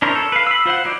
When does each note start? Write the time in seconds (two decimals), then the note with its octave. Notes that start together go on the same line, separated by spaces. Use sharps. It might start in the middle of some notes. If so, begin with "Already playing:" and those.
0.02 D4 E4 A#4 C5 C#5
0.16 A4
0.32 B4 F5
0.47 B5 E6
0.66 F4 C5 F5 F#5
0.85 F#3 D#4 E4 C5 D5